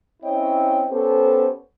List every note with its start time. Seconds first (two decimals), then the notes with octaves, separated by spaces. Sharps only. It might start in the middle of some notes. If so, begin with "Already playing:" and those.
0.23 C4 C#4 E4 C#5 D#5 G5
0.90 B3 C#4 G4 A4 C5